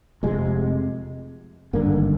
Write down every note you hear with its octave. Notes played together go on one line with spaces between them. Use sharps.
F1 F2 C3 G#3
G#1 G2 D3 A#3
D#3